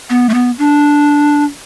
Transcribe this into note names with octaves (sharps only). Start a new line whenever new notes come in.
B3
A3
B3
D4